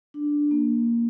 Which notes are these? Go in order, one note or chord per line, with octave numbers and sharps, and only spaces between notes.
D4
A#3